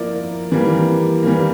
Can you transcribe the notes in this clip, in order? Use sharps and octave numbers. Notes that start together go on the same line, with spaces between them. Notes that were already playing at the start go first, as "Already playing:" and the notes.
Already playing: F3 A#3 E4 A#4 D5
E3 G3 A#3
E3 G3 A#3